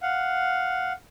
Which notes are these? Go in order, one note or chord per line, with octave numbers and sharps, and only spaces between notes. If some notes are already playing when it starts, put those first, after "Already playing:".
F5 F#5